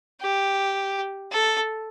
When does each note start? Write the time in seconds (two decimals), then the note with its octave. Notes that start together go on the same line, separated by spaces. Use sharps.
0.22 G4
1.32 A4